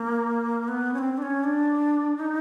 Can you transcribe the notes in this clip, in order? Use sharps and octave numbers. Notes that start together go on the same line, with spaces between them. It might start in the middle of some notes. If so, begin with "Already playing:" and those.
Already playing: A#3
B3
C#4
C4
D4
C#4
D4
D#4